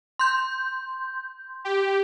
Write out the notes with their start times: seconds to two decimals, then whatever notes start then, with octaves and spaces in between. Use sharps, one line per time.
0.19 C6 G6
1.65 G4